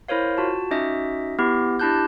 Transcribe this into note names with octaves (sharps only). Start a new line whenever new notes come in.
E4 A#4 C5 C#5 F5
F4 F#4 A5
C#4 D#4 F#4 D#5 E5
B3 E4 G4
D4 E4 G4 A5 F#6 G6